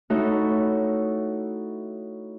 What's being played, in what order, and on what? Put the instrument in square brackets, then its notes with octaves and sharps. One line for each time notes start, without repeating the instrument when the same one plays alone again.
[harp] A3 D#4 E4 F#4 A4 C#5